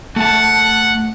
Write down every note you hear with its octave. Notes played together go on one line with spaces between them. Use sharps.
A3 F#5 A5